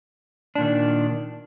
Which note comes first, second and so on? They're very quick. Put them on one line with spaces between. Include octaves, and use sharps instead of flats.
D4 A#2 D#3